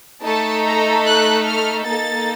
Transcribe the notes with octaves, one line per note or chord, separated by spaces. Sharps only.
A3 D#4 A4 A5
A#5
F#6
F6
A#3 D#4 A4 A6